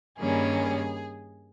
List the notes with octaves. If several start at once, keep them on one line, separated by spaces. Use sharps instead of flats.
G2 D#3 G3 A#3 C#4 G#4